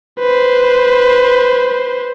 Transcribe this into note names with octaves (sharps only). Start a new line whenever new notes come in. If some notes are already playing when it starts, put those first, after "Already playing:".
B4 C5